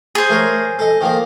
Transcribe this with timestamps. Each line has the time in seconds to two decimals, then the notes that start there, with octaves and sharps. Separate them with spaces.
0.15 G#4 C5
0.29 A3 A#4 C#5
0.79 A4 D#5
1.01 D#3 F3 A#3